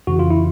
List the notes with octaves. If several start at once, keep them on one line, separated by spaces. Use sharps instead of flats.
F2 C#3 E3 F#4
F4
E4